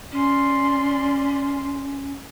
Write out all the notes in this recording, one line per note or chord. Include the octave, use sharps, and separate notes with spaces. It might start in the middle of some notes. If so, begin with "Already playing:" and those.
C#4 D5 C6